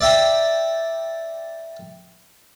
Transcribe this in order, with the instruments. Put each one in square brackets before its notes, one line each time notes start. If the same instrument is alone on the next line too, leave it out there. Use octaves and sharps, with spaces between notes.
[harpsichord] D5 E5 G5 A#5